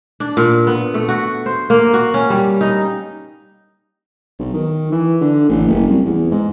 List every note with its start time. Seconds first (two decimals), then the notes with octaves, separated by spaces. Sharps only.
0.20 D4
0.37 A#2
0.67 B3
0.94 A3
1.09 F#4
1.46 C5
1.70 A#3
1.94 F#4
2.14 C#4
2.30 G3
2.61 D#4
4.39 B1
4.54 D#3
4.92 E3
5.21 D3
5.49 A1
5.68 F#1
5.88 C2
6.05 E2
6.31 G#2